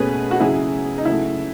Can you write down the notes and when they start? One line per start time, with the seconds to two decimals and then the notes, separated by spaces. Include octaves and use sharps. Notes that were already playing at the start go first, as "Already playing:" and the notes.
Already playing: B2 A3 C#4 G#4 B4
0.31 F#4
0.40 C#3 F#3 C#4 E4 G#4
0.98 D#4
1.05 C#3 F#3 A3 E4